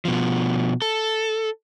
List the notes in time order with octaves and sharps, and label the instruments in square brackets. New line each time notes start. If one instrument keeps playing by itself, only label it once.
[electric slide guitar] B2 F3
A4